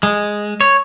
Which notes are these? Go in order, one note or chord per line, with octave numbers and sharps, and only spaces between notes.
G#3
C#5